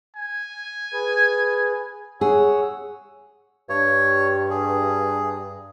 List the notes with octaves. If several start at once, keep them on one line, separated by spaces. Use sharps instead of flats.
G#5
G#4 B4
G#4 C#5 F#5 E6
G2 C#5
G#4